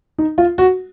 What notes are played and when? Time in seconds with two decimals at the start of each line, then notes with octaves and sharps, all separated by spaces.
0.18 D#4
0.38 F4
0.58 F#4